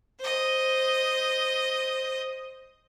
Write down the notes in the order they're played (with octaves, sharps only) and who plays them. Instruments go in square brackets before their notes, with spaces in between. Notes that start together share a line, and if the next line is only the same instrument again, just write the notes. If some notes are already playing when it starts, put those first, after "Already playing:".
[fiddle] C5 D#5